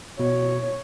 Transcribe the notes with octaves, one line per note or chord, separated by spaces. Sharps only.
B2 C#5